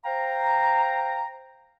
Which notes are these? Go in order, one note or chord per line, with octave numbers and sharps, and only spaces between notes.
C5 F5 G5 A#5